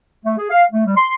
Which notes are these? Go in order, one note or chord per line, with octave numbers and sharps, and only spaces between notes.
A3
G#4
F5
A3
G3
C6